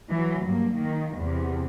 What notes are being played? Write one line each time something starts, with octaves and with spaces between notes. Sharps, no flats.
E3 F#3
G2 A#3
D#3 A#3
E2 C3